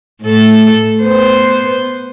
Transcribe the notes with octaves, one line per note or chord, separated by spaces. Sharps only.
A2 A4
B3 B4 C5